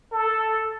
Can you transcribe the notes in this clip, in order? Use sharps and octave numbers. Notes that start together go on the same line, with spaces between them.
A4